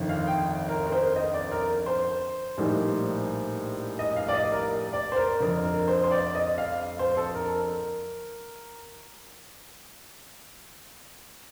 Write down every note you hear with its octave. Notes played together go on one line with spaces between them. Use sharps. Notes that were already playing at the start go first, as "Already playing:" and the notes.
Already playing: G1 F2 D#3
F5
G5
A#4
A#4
C5
D#5
D5
A#4
C5
A#1 A2 G3 A#3 D#4
D#5
F5
D5
D#5
A#4
D5
C5
A#4
G1 F2 D3 A#4
A#4
C5
C5
D5
D#5
F5
C5
A4
A#4